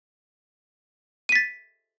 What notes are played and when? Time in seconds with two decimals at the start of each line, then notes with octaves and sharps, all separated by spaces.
1.29 D#7
1.32 B6
1.35 A6